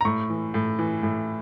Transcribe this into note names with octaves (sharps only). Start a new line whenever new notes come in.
A#5
A2 C#6
E3
A2
E3
A2